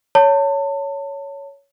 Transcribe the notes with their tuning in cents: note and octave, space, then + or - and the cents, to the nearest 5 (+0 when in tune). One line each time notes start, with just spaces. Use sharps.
C#5 +10 A5 +35